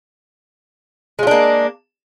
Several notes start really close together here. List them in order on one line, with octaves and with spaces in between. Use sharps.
G#3 F4 D4 A#3